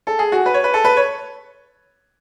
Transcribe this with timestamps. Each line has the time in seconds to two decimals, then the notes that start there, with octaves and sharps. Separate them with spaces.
0.07 A4
0.19 G#4
0.32 F#4
0.46 B4
0.54 C#5
0.64 B4
0.74 A4
0.84 B4
0.97 C#5